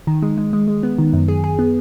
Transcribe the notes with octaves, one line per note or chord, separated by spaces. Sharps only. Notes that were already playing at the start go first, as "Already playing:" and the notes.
D#3
G#3
G#3
G#3
G#3
B3
D#3
F#2
G#4
G#4
B3